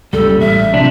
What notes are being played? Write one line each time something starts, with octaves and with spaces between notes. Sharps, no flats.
F#1 C#2 G3 A4
A1 E5
C3 F3 G3 D4